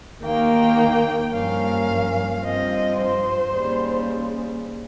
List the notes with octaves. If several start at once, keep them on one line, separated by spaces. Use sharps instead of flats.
D#2 D#3 A#3 G5
G2 F3 A#3 C#4 F5
G2 F3 C4 D#5
C5
D#2 C#3 G3